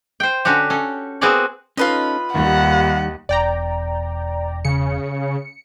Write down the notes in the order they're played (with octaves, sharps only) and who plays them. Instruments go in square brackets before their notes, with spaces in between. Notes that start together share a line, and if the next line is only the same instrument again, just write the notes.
[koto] C5 G5
D3 C#4 F#4 G4
C#4 A4
B3 C4 F#4 G#4 A#4 D5
[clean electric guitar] C#4 D#4 A4 [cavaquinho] F4 B4 D#5
[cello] D#2 [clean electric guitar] D#3 G3 [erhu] F#5
[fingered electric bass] E1 [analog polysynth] D5 G5 A#5
[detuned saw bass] C#3 [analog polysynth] C#7